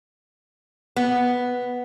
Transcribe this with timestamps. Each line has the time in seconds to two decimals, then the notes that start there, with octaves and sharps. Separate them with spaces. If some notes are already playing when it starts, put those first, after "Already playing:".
0.96 B3